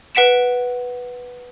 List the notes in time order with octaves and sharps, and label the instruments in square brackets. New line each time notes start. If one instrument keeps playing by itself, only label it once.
[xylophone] B4 F#5 B6 D7 E7